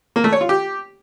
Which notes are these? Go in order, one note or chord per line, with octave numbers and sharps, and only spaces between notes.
A#3
A3
C#5
F4
G4